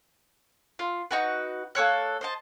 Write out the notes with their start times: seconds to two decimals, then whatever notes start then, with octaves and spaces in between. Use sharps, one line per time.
0.79 F4
1.11 D#4 F#4 B4
1.75 A#3 A4 C#5 F#6
2.21 C5 D#5 A5